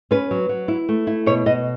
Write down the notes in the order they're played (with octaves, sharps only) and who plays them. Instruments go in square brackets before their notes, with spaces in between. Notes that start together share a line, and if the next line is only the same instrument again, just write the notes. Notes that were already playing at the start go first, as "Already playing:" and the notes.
[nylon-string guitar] C#4 B4
F#3
F#3
E4
A3
E4
B2 C#5
B2 D#5